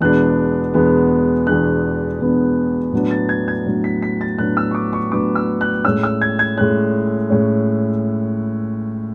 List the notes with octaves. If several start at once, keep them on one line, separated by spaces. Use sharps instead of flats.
E2 B2 G#3 B3 D4 F#6
E2 B2 G#3 B3 D4
E2 B2 G#3 B3 D4 F#6
E2 B2 G#3 B3 D4
A2 F#3 B3 D4
A6
G#6
G#6
A2 F#3 B3 D4
B6
B6
A6
A2 F#3 B3 D4 F#6
E6
C#6
D6
C#6
A2 F#3 B3 D4 D6
E6
F#6
A2 G#3 C#4 E6
E6
G#6
G#6
A2 G#3 C#4 F#6
A2 G#3 C#4